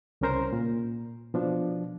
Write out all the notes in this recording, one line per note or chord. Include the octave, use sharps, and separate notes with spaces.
C2 C#3 C#4 A#4 C5 A#5
A#2
B2 F3 D4